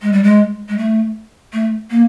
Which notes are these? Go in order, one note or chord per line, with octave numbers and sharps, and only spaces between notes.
G#3
G3
G#3
G#3
A3
A3
A#3